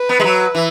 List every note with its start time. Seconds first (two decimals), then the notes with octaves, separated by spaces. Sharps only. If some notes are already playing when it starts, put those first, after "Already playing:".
Already playing: B4
0.09 B3
0.19 G#3
0.24 F#3
0.55 E3